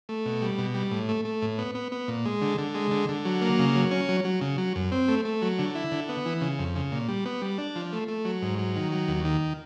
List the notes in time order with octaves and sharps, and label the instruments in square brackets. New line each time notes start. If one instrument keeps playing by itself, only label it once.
[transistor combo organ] A3
B2
G3
B2
G3
A2
A3
A3
A2
B3
B3
B3
A#2
G#3
D3
D3
G#3
D3
D3
F#3
A#3
C#3
F#3
C#4
F#3
F#3
C#3
F#3
F#2
C4
A3
A3
F#3
D3
E4
D3
B3
E3
C#3
F2
C#3
A#2
G3
B3
G3
D4
F3
A3
A3
F#3
G#2
F#3
D#3
F#3
D#2
D#3